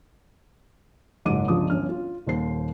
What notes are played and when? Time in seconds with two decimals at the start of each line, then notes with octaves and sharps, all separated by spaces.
1.25 F#1 C#2 G#2 F#3 D6 D#7
1.48 G1 C#2 G2 F3 D6 D#6
1.70 G1 C#4 F6
1.89 F4
2.26 D#1 D#2 C5 C7